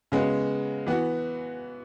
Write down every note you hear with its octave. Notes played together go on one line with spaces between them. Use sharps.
C#3 G#3 B3 F#4
E3 B3 F#4